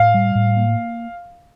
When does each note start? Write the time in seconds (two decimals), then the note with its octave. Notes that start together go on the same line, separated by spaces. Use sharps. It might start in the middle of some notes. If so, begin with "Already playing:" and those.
Already playing: A2 F5
0.14 G3
0.35 A2
0.57 A#3